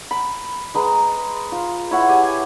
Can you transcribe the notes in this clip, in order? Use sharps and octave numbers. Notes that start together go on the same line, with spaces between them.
B5
G#3 B4 A#5
F4
E4 C#5 F#5
G4 G#5